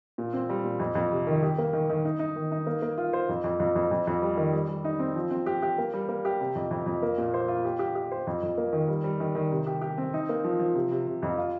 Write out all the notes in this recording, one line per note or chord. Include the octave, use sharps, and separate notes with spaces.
A#2
C4
G3
A#2
F2
F2
C3
D#3
G4
A#3
D#3
D#3
D#4
D#4
D#3
D#4
A#3
A#3
F4
C5
F2
F2
F2
F2
F2
F2
G3
D#3
G3
G3
D#4
C4
F3
C4
G4
G4
A#3
G3
A#3
G4
C3
F2
F2
F2
A#3
A#2
C5
F4
G4
G4
G4
C5
F2
F2
A#3
D#3
G3
G3
D#3
D#3
C3
G4
G4
C4
D#4
A#3
F3
F3
C3
C3
C3
F2
F4